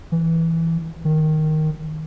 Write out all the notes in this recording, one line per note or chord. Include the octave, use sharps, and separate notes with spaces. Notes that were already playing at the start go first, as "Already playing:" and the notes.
E3
D#3